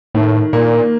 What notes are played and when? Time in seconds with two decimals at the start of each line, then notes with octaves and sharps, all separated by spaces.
0.15 A2 D#3
0.53 A#2 A#3